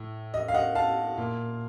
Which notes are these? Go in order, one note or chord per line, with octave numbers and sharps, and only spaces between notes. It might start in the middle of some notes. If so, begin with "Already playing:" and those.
Already playing: A2
D#5
F5
D#5 F#5
F5 A5
A#2